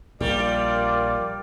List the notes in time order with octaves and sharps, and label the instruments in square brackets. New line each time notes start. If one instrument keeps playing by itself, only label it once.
[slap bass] A#1 [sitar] G3 [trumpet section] F4 D5 [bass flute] A#4